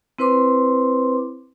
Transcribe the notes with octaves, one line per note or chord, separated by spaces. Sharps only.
C4 E4 B4 C5 C6 D6